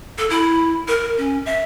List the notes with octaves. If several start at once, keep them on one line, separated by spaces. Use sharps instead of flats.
A4
E4
A#4
C#4
E5